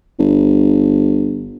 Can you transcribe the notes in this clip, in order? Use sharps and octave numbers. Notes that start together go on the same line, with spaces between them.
G1